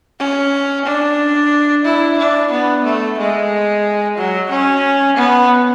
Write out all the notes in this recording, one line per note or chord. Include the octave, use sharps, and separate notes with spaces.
C#4
D4
E4
D4
B3
A3
G#3
F#3
C#4
B3